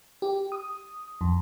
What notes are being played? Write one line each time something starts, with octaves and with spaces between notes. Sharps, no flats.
G4
D#6
F2